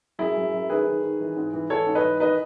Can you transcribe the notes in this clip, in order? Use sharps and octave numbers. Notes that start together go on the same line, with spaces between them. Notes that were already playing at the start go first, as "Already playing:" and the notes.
F#2 E4 G#4
F#2
F#2
D#3 G#4 B4
D#3
D#3
E3
G#2
E3
E3 A4 C#5
G#2
B4 D#5
E3
D#3 B4 D#5